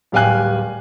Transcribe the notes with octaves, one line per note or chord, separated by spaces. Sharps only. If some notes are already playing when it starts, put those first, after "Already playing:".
D1 G3 F5 G5 G#5 F#6